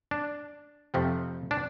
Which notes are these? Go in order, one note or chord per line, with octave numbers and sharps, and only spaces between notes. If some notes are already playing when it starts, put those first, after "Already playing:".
D4
F2 C3 F3 A3 C4
D4